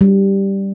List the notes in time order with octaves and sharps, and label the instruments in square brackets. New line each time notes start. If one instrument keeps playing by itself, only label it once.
[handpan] G3